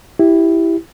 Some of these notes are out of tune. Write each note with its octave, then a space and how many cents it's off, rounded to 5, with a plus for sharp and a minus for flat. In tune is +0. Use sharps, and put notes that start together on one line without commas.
E4 +0 G4 +0